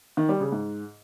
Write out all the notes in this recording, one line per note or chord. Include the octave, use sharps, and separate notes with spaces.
D#3
G3
C#3
G#2